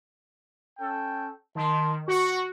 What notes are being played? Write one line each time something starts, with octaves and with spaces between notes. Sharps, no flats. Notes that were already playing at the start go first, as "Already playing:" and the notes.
C#4 A4 G5
D#3 A5 C6
F#4 C#6